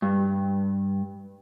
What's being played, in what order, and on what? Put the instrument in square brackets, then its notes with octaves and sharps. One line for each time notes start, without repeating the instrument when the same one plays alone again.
[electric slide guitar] G2